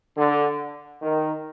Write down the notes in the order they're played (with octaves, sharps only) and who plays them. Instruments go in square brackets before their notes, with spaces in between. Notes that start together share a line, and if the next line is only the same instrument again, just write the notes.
[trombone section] D3
D#3